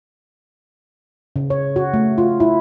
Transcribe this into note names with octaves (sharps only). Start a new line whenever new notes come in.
C#3
C#5
F#4
A3
F4
E4